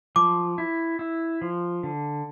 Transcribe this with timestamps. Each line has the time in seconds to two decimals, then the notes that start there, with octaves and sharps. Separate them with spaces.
0.16 F3 D6
0.58 E4
0.99 E4
1.42 F3
1.83 D3